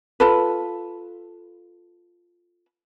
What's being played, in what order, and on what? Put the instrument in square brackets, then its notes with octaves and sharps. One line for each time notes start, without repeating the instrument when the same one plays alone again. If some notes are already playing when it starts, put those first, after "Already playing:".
[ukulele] F4 A4 B4